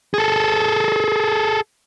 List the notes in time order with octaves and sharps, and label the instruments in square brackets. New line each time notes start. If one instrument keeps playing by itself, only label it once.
[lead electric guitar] G#4 A4